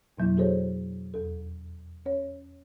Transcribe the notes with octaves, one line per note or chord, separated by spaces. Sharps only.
F2 B2 F#3 A#3 E4
F#4 G#4 A4 C5 C#5
E2 A4
C#4 C#5